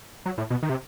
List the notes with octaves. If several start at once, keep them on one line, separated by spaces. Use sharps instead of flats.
F#3
A2
B2
D#3
C3